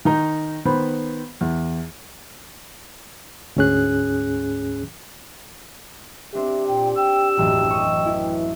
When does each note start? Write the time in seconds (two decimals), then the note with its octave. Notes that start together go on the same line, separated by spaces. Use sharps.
0.05 D#3 D#4 A#5
0.65 D#3 B3 C5 B5
1.41 E2
3.56 D2 G#2 C#4 G#4 F#6
6.35 C4 D4 G4 E5
6.68 A#2 G5
6.97 G5 E6
7.37 E1 A1 F#2 G5
7.70 D#5 C#6
8.06 E3 E4